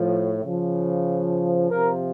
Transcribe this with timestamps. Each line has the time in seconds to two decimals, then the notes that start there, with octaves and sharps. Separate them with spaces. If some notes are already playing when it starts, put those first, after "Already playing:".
Already playing: A2 F3
0.45 C#3 F3
1.71 C3 F3 A#4